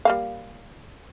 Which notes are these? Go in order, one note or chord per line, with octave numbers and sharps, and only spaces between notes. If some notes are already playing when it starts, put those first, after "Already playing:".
G3 A#3 F5